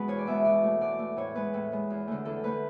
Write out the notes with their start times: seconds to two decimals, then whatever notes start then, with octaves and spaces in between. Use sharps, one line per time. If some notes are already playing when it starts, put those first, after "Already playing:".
Already playing: B2 G#3 B3 B4
0.08 E2 C#5
0.19 D5
0.27 B2 G#3 B3 E5
0.45 B2 D5
0.64 A3
0.81 B2 D5
0.99 A3
1.17 A2 C#5
1.35 G#3 B3 B4
1.54 A2
1.72 G#3 B3
1.90 E2
2.08 D3 A3
2.25 E2 A4
2.43 D3 A3 B4